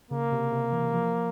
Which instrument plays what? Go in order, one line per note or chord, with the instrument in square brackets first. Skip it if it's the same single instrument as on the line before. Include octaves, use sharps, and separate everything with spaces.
[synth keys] C#3 [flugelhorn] A#3
[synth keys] C3
C3
E3
F3